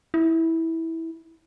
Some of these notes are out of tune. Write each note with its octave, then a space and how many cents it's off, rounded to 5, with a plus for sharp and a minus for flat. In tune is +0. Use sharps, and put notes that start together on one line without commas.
E4 -15